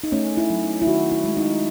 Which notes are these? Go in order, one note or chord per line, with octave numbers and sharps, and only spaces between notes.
D#4
A3 C#4
E4
F#3
D#4
E4
D#3 F#4
E4
G#3
D#4